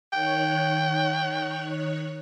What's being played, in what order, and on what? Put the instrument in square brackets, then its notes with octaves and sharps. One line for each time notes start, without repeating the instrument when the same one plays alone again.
[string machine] D#3 C#5 F#6 [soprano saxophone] G5